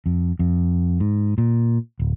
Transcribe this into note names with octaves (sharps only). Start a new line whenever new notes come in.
F2
F2
G#2
A#2
D1